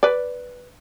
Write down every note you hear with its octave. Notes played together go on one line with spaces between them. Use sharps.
B4 D5